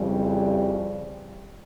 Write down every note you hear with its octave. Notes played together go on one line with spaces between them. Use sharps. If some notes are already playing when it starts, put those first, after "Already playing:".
Already playing: F2 C#3 E3 G3